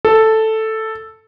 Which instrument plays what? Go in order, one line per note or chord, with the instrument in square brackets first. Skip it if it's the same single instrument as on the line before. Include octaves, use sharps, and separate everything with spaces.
[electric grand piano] A4